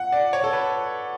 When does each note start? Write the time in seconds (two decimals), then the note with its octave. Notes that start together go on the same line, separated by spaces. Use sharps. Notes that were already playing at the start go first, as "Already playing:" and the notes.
Already playing: F#5
0.12 D5
0.33 C#5
0.44 A4
0.53 B4